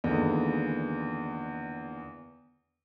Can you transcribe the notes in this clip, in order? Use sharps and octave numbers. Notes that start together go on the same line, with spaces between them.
E2 A#2 D3 D#3 G#3 B3